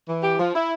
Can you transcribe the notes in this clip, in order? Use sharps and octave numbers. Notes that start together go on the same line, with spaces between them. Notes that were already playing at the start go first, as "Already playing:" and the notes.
E3
G4
F3
E4